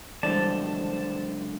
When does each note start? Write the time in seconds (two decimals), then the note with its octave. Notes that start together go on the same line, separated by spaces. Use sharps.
0.23 C#2 F#2 D3 E3 G3 C5 D5 A5